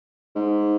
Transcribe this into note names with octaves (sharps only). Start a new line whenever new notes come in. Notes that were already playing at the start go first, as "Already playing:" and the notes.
G#2